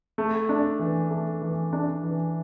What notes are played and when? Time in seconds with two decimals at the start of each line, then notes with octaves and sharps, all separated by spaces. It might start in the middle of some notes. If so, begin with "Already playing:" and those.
0.18 A3
0.49 D4
0.79 E3
1.10 A3
1.42 E3
1.73 D4
2.03 E3